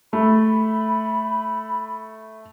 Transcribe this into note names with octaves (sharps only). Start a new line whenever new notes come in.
A3 B5